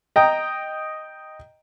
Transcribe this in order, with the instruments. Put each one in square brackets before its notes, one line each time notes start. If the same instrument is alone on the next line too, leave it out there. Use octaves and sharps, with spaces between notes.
[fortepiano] D#5 G5 A#5